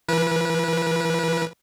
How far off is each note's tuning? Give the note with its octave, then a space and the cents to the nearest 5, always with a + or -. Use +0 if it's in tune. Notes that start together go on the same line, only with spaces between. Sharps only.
E3 +35 B4 -30